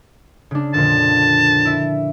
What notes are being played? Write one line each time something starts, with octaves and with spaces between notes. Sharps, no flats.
C#3 D4
F2 A#2 D3 A5
E4 E5